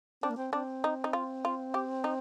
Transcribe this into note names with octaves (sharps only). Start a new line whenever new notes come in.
C4 D4
A#3
C4
C4 D4
D#4
D#4
F4
F4
G4
D#4